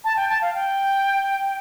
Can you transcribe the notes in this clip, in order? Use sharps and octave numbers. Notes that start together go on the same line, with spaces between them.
A5
G5
A5
F5
G5